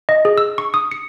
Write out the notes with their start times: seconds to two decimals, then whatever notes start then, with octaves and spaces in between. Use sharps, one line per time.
0.09 D#5
0.25 G#4
0.38 E6
0.58 C#6
0.74 D#6
0.91 C#7